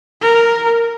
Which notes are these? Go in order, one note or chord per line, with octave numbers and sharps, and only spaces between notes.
A#4